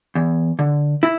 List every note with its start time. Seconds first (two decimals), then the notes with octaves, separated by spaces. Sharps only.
0.15 E2
0.59 D3
1.03 E4